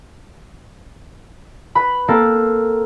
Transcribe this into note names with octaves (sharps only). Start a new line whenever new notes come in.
B4 B5
A#3 C4 A4